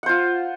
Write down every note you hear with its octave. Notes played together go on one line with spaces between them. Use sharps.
F4 C5 F#5